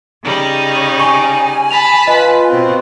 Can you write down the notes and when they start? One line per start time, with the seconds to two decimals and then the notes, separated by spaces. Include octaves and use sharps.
0.23 C#3 G3 D#4
1.00 G#5 C#6
1.71 A5 B5 F7
2.07 F4 B4 D#5
2.48 B2 C4